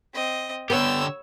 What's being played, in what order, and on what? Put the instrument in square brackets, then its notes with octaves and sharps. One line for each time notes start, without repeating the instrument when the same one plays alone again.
[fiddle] C4 D#5
[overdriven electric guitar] D3 G4 [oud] B3 [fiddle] C#5 E6